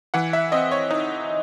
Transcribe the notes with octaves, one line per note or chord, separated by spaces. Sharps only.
E3 F#5
E5
C4 D#5
C#5
D#4